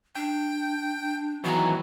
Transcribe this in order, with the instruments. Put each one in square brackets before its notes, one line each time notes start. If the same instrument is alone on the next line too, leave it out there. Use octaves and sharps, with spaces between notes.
[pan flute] D4 [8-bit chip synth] G5
[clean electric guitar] D#3 G#4 A#5 [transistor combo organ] E3 F#3 [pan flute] B3